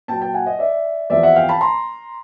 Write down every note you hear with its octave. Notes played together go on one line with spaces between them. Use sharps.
A#2 F#3 G5 A5
G5 A5
F#5 G#5
D#5
D5 E5
E2 C3 F3 D5 E5
E5 F#5
F5 G5
A5 B5
A#5 C6